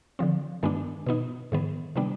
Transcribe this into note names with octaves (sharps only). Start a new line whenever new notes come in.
D3 F3 C4
G2 D#3 G#3 B3 D4
B2 B3 D#4
G#2 D#3 B3
C3 G3 B3 D4